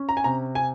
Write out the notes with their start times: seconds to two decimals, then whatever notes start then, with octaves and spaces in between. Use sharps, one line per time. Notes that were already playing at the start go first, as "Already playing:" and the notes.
Already playing: C#4
0.09 A#5
0.17 G#5
0.24 C3 A#5
0.55 G#5